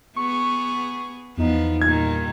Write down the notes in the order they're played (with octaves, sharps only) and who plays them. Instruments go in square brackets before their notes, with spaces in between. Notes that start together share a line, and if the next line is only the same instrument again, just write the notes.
[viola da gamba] B3 G#4 [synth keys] C#6
[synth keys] E2 D#4 [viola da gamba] F3 B3
[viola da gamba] G2 A#2 D#3 [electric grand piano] G#6